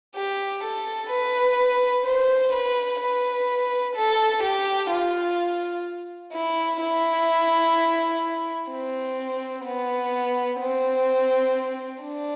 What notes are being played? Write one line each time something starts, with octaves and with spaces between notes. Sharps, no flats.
G4
A4
B4
C5
B4
B4
A4
G4
F4
E4
E4
C4
B3
C4
D4